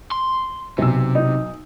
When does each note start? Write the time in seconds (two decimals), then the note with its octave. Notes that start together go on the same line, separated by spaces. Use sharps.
0.11 C6
0.78 B1 C3 E6
1.15 D#4